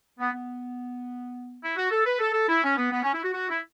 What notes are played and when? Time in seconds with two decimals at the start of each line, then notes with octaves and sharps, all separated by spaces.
0.19 B3
0.33 B3
1.63 E4
1.77 F#4
1.91 A4
2.06 B4
2.19 A4
2.33 A4
2.48 E4
2.63 C#4
2.77 B3
2.92 B3
3.03 C#4
3.13 E4
3.23 F#4
3.34 F#4
3.49 E4